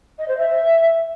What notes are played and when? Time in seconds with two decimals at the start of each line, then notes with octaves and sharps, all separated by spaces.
0.19 D#5
0.28 C5
0.37 E5